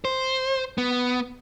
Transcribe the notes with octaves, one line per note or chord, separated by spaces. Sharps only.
C5
B3